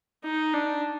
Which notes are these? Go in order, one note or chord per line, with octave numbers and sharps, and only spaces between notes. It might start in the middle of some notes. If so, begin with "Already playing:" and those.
D#4
D4